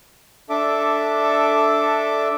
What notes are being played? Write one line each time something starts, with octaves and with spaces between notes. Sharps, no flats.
D4 A4 E5 D6